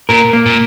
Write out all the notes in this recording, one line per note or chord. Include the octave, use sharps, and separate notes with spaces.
A#2 A#4
A#3
A#2